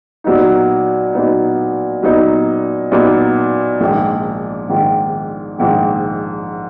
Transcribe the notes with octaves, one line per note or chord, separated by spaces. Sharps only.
A#2 F#3 B3 D#4
A#2 F#3 B3 D#4
A#2 F#3 B3 D#4
A#2 F#3 B3 D#4
A#1 G#2 D#3
A#1 G#2 D#3
A#1 G#2 D#3